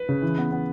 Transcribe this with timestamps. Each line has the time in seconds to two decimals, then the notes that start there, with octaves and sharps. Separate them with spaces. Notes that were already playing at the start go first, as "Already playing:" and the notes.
Already playing: B4
0.09 C#3
0.22 E3
0.38 B3
0.52 B3